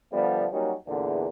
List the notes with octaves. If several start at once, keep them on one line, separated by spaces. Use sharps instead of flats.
D3 F3 G3 A3 B3
F#3 G3 A#3 C#4 D#4 F#4
E2 A#2 D3